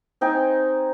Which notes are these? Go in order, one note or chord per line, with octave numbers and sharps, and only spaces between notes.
C4 D#4 G5 G#5